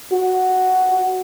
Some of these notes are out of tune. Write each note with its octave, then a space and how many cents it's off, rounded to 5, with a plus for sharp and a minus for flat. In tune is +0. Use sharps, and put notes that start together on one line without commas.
F#4 +5